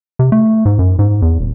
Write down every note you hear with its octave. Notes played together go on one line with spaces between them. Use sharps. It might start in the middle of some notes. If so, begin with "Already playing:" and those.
C3
A3
G#2
F#2
G#2
E2
D#1